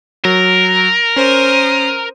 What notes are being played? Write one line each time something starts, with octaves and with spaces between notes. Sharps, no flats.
F#3 A#4
C#4 C5 D#6